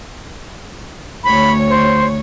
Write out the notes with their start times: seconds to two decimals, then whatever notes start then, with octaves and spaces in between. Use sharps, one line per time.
1.24 D2 C#5 B5
1.69 C5